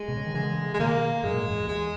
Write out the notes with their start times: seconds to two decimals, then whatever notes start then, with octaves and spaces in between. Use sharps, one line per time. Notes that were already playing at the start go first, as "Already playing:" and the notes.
Already playing: G#3
0.08 B2
0.17 C#3
0.26 D#3
0.34 C#3 E3 G#3
0.74 G#3
0.79 B2 D#3 A#3
1.23 F#2 A#2 G#3
1.36 A#2
1.45 E2 G#2
1.68 E2 G#3